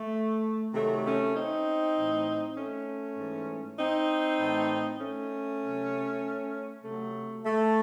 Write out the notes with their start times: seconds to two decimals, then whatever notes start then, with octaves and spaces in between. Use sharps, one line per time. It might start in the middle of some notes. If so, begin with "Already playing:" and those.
Already playing: A3
0.73 C3 D#3 F#3 A3
1.04 A3 C#4
1.35 C4 D#4
1.95 A2 E3
2.57 A3 C#4
3.17 G#2 E3
3.78 C4 D#4
4.39 A2 E3
4.99 A3 C#4
5.61 C3 F#3
6.83 C3 F#3 A3
7.44 A3